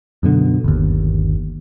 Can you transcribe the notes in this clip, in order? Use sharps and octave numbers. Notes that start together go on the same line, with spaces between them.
F#2 B2 D3
G1 D#2